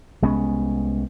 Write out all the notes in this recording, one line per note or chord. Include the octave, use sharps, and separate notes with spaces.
C2 G#3 B3 C#4